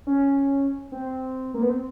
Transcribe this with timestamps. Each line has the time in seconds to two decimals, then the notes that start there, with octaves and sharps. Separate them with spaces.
0.07 C#4
0.92 C4
1.54 A#3
1.62 B3
1.69 C4